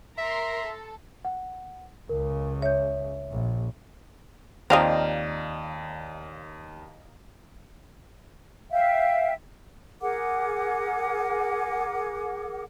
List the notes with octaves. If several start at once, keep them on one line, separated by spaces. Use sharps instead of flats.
A#4 E5 A#5 C6
A4
F#5
C#2 C#3 A#4
C#5 E5 G6
A#1
D#2 F3 C4 D5 D#5 F5 A#5 G6
E5 F5 G5
G#4 A#4 F#5 D6